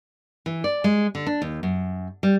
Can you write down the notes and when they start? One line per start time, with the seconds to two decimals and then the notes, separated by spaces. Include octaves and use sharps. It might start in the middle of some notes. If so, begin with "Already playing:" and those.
0.46 E3
0.64 D5
0.84 G#3
1.15 D3
1.27 D4
1.42 D#2
1.63 F#2
2.23 G3